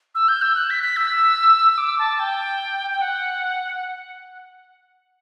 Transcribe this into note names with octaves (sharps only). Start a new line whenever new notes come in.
E6
G6
E6
F#6
B6
B6
E6
E6
D6
A5
G5
G5
F#5